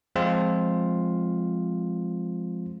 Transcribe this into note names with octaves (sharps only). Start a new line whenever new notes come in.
F3 G#3 C4 F4